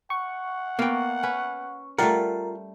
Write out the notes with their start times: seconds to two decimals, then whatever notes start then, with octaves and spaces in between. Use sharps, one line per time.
0.10 F#5 C#6
0.79 A#3 B3 A#4 G5
1.23 C#4 B4
1.98 G3 A3 F4 A#4 D5 F#5